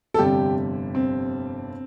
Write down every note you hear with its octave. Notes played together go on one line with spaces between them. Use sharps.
A4
G1 F2 C3 G3 G4
C4